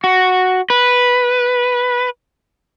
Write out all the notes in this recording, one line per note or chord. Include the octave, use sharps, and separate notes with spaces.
F#4
B4